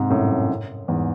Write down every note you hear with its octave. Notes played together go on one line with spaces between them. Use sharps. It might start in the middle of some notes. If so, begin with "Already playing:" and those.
Already playing: G#2 C3
F#2 A2
E2 G#2